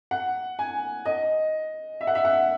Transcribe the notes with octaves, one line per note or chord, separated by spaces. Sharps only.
F#5
G#5
D#5
E5
F#5
E5
F#5